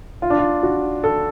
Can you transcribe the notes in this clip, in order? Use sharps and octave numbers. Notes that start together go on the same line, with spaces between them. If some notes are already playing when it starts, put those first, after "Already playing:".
F4
D4
F4
F#4
A4